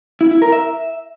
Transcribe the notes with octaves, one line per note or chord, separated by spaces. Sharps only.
E4
E4
A#4
E5